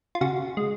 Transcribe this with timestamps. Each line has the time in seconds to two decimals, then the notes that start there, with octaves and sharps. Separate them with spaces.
0.15 F4
0.21 C#3 F#4
0.57 G#3